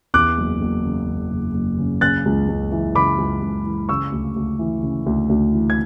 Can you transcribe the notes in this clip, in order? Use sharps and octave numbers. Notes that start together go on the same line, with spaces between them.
E2 D6 F#6
F#1
F#1
C#3
E2
F#1
F#1
C#3
C#3 F#6 A6
C#2
C#2
E3
C#3 B5 D6
C#2
C#2
E3
C#3 C#6 E6
D2
D2
E3
C#3
D2
D2
E3
G#6